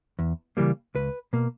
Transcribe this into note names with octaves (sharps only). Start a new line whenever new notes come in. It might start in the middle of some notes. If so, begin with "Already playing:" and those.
E2
C#3 E3 G3 A#3
C#2 B4
B2 A#3